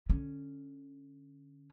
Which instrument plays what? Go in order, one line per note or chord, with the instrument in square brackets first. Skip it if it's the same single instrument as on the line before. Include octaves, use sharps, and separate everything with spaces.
[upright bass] D3 C#4